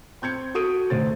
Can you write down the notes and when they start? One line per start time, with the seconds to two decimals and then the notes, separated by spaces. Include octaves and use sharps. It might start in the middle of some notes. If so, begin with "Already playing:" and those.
0.22 C4 G6 G#6 C#7
0.55 F#4 A4 D#6 D7 D#7
0.90 F1 A3 C5 A6